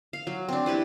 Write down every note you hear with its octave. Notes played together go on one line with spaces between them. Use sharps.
F5
F#3
C4 D4
E4 G4 B4 C5